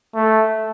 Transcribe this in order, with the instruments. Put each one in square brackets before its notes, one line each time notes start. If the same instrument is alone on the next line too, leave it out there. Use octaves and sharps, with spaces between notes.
[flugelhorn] A3